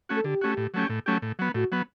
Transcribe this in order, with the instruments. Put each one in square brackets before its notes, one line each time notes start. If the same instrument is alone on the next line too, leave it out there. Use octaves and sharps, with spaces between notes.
[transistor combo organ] A3 C#4 F#4
[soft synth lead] A4
[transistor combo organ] D3 [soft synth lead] G4
[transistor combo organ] A3 C#4 F#4
A2
F#3 A3 C#4 G4
A2
F#3 A3 C#4 G4
A2
F#3 B3
[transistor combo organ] A2 [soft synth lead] F#4
[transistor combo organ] F#3 B3